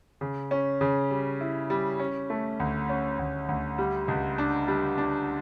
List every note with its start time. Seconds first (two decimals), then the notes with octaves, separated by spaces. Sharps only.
0.21 C#3
0.51 C#4
0.81 C#3
1.11 G3
1.41 E4
1.70 G3
2.00 C#4
2.30 A3
2.60 D2
2.89 C#4
3.19 D2
3.49 D2
3.78 G3
4.08 C#2
4.38 D4
4.68 G3
4.98 D4